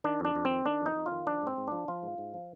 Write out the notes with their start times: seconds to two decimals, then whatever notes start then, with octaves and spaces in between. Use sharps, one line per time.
0.04 D#3 D4
0.20 F2 D4
0.35 F2
0.45 D#3 C4
0.66 D#3 D4
0.81 F2
0.86 D#4
0.96 F2
1.06 F4
1.12 D#3
1.27 F3 D4
1.42 G#2 C4
1.57 G#2
1.67 F3 D4
1.88 F3 F4
2.03 G#2
2.18 G#2
2.34 F3